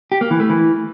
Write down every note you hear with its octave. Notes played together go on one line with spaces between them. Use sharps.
G4
A#3
E3
A3
E3